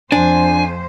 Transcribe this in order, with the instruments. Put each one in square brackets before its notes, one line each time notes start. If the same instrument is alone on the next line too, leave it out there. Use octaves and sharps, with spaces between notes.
[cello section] F2 C5 [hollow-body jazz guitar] D4 [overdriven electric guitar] G#5